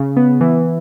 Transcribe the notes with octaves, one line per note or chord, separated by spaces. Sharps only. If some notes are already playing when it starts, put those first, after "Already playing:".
Already playing: C#3
B3
E3